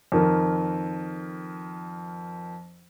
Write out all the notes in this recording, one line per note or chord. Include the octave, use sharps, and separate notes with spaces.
F2 D#3 A#4